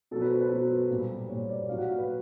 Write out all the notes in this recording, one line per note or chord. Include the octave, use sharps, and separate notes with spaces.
B2 F#3 A4
B4
C5
B4
B2 F#3 C5
A#2 G3
A#2 G3 C#5
D5
A#2 F#3 F5
F#5
F5
B4